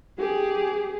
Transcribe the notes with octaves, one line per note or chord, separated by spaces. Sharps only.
G4 G#4